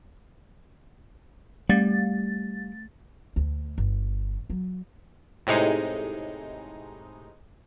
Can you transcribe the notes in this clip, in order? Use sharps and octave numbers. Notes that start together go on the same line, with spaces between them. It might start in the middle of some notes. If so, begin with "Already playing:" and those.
G3 A3 A6
D2
G1
F#3
A2 C3 G#3 D#4